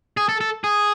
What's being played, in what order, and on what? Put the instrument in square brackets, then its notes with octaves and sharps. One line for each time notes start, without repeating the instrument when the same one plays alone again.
[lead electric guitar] G#4
A4
A4
G#4